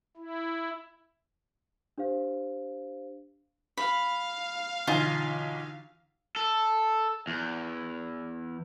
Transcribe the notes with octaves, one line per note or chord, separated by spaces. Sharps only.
E4
D4 G4 C5 F5
F5 B5
B1 D3 E3 D#4 F4 G#5
A4
E2